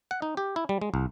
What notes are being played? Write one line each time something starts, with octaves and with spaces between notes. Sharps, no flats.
F#5
D#4
G4
E4
G3
G#3
C2